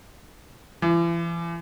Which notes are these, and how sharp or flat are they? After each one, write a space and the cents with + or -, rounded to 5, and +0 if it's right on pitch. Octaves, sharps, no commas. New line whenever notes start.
E3 +40